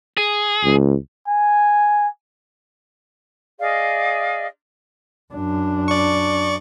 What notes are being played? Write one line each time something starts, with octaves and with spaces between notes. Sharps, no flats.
G#4
C#2
G#5
G#4 D5 D#5 F5
F#2 D4
D5 C#6